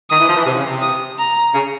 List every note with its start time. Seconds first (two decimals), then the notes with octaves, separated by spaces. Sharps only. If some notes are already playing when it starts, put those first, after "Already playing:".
0.10 D#3 D#6
0.19 E3
0.28 F3
0.37 E3
0.45 C3
0.56 C#3
0.64 C3
0.82 D#6
1.18 A#5
1.54 C#3